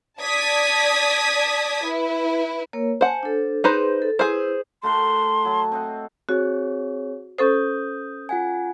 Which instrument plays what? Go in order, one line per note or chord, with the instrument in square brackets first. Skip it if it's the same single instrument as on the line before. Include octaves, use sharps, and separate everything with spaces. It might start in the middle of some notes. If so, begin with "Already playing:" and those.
[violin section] D5 A5 D#6 G#6 B6
E4 B4
[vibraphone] A#3 A#4 C#5
[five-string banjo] C5 F#5 [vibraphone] G#5 A5
[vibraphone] D4 A4
[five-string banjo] D#4 B4 C5 [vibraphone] G#4 C6
[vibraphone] A4
[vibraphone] E4 B4 [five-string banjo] G#4 C5
[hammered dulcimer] A3 F#4 A#4 [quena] C6
[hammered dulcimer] F#3 A5
C4 D#5 F#5
[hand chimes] C4 G#4 C#5 [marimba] F#4
[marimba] C#4 A4 C5 [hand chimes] D#6 G6
[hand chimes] F4 F#5 G#5